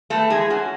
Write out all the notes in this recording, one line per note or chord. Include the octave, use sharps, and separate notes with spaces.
A3 B3 A4
E3 G#3 G#4
C#4 F#4